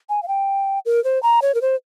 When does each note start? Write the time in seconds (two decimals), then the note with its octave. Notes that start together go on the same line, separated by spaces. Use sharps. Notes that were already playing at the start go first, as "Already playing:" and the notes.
0.09 G#5
0.23 F5
0.28 G5
0.86 A#4
1.04 C5
1.23 A#5
1.42 C#5
1.55 A#4
1.62 C5